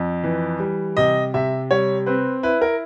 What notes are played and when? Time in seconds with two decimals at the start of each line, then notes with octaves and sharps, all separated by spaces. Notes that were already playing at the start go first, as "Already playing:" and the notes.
Already playing: F2
0.24 E3
0.60 G3
0.97 C3 D#5
1.34 C3 E5
1.71 G3 C#5
2.06 C4 B4
2.43 E4 B4
2.61 A#4